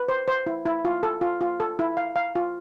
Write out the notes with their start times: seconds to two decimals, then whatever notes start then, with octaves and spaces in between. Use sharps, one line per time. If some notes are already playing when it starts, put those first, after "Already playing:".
Already playing: B4
0.08 C5
0.28 C5
0.46 E4
0.66 E4
0.85 F4
1.03 A4
1.21 F4
1.41 F4
1.60 A4
1.79 E4
1.97 F5
2.16 F5
2.35 F4